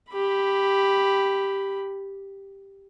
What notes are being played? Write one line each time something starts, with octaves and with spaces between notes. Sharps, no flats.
G4 B5